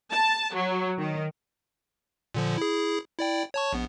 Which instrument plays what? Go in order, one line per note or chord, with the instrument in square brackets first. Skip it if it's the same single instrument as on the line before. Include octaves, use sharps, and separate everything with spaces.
[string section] A5
F#3
D#3
[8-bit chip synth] A#2 D3 F3
E4 G#4
E4 D5 G5
C#5 A5 C#6
A#1 B3